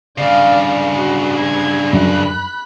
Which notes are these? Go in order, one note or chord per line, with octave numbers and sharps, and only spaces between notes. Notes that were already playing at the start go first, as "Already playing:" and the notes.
G2 C#3 D5 F5
F#4
G4 G#6
F#2 B5 F#6